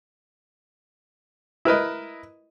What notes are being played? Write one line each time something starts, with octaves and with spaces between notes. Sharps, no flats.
E4 A#4 B4 D#5